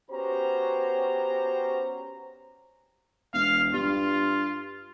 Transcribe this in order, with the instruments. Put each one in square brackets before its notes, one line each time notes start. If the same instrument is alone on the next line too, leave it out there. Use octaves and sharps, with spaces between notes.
[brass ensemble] B3 C#4 F#4 G4 C5 A#5
[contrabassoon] E1 [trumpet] F5
[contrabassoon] G2 [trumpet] F4